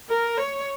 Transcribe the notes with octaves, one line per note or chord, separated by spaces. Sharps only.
A#4
C#5